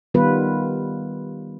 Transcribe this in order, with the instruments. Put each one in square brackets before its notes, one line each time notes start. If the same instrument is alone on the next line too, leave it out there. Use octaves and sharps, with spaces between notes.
[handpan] D#3 G3 B3 F4 B4